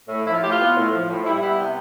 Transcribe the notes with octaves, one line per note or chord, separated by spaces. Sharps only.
A2
F3 E4
F4
A2 G4
F4
B3
A2
F3
A2
G3 E4
B3 E4
C3